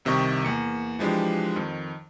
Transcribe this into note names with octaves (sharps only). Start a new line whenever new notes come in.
C2 C3 D#3 D#5 C#6
E2 A#3 C#7
E3 F3 G#3 D4 G4
F2 D#3